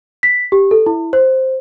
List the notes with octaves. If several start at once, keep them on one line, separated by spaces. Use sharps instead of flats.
B6
G4
A4
E4
C5